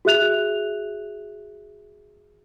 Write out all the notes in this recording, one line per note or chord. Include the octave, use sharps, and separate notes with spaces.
F#4 G#4 E5 F#6 F7